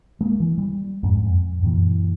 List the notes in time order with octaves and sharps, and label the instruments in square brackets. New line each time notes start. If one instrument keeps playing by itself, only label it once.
[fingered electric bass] G#3 A#3
E3
G3
F2 G#2
F2
F#2 A#2 E3